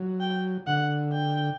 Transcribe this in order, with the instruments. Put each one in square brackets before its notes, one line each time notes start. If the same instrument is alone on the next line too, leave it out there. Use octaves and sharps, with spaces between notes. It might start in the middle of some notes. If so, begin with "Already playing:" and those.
Already playing: [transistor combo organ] F#3
[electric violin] G5
[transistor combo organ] D3 [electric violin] F#5
[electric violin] G5